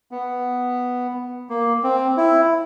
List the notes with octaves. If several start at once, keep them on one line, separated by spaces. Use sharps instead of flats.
B3
A#3
C4
E4